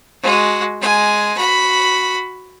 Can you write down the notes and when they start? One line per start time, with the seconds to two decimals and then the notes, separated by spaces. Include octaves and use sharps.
0.22 G#3 F#4
0.81 G#3 G#5
1.38 F#4 B5